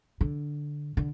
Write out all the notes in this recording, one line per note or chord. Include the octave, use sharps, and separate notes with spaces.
D3
D3